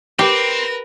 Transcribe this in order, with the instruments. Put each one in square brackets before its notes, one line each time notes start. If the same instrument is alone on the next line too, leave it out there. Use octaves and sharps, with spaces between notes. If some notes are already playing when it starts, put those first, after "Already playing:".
[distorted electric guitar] C4 [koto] G4 [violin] A#4 B4